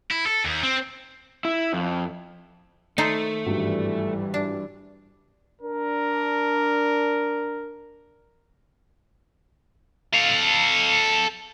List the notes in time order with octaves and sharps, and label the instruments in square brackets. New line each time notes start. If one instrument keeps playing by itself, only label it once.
[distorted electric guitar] E4
A4
D#2
C4
[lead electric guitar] E4
F2
[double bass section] D#3 [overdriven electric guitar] A3 [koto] D#4 A4 C5
[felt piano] G#1 G2 [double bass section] E3 G3
[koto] D4
[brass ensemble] D4 A#4
[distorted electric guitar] A4 F5